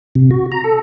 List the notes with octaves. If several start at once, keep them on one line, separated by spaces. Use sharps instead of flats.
C3
F#4
A#5
A4